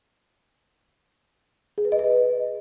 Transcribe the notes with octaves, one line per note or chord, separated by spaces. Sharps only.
G#4
B4
D#5
B4